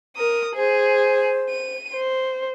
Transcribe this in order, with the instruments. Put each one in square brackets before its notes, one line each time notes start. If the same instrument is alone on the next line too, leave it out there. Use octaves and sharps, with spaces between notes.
[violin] A#4 D#6
[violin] G#4 [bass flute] C5
[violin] D#7
C5